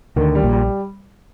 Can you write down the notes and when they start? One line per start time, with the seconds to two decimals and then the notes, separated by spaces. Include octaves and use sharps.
0.16 D2 D3 D#3
0.35 G3
0.44 A#1 A#2
0.53 G3